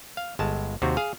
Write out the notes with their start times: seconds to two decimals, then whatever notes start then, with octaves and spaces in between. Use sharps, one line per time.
0.17 F5
0.39 G1 G#3 A5
0.82 D#2 C3 C4 F#4
0.97 G#4 F5